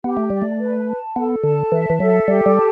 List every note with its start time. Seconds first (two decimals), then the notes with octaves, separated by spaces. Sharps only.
0.04 B3 G4
0.17 A3
0.30 G3 D5
0.42 A3
0.60 B4
0.88 A5
1.16 B3 A4
1.43 D3 A5
1.72 E3 E5
1.90 E3
2.00 F#3 A4
2.27 G3 G4
2.46 G3
2.56 A5